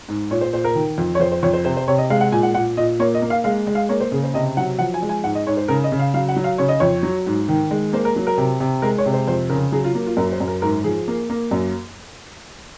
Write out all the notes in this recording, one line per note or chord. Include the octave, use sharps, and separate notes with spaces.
G#2
A#2 C#5
C5
A#2 C5
A#4
D#3
F2
C#5
F2 C5
C5
F2 C#5
C5
C3 C5
C5
C3 C#5
D#5
G#3 F5
F#5
A#2 G#5
F#5
A#2 F#5
A#2 D#5
A#3 C#5
D#5
A#3
F5
G#3 F5
G#3
F5
A#3 C#5
C5
C#3 G#4
C5
C3 D#5
F#3 F#5
F3 F#5
G#5
G#3
G#5
G#2 F#5
D#5
G#2 C#5
C5
C#3 A#4
D#5
C#3
F5
F#3 F5
F#5
F#3
F5
C#3 C#5
D#5
F2 C#5
F#3
G#2
D#3
G#3
A#3 C5
A#4
F#3
A#4
C3
C3
G#3 A#4
C#5
C3
C5
F2 C5
C#3 A#4
F#3 G#4
F4
A#3
F4
F#2 A#4
C5
F#2
A#4
G#2 A#4
F3 G#4
A#3
A#3
F#2